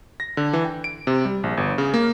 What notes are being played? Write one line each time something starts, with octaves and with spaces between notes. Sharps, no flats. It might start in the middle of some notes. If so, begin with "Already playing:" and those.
A#6
D3
E3
G5
D7
C3
G3
A#1
G1
C#3
A#3